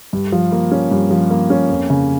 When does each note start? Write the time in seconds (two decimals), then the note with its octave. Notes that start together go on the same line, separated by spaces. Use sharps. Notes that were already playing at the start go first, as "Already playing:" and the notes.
0.13 G2
0.32 F3
0.52 A#3
0.72 C#4
0.91 G2
1.11 F3
1.31 A#3
1.50 C#4
1.69 F2
1.90 C#3